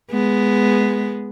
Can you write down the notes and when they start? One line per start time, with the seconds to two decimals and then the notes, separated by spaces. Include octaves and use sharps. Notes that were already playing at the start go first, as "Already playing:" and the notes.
0.11 G#3 B3